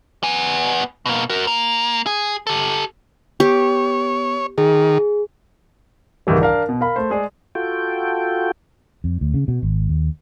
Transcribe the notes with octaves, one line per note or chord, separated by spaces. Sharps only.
B3 G#5
B2 A#3
F#4 A#4
A#3
G#4
G4 A4
B3 G4 C#5
D#3 G#4
C#2 G#2 D#3 E3 G3
D4 A#4 F5
B2
A#4 F5 B5
A3 C5
G#3 G#4 D5
F4 F#4 A4 G5
F2
D2
C#3
B2
G#1
D#2